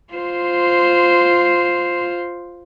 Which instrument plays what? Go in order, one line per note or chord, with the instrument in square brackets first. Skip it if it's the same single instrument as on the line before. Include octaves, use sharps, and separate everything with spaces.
[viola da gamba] F4 C5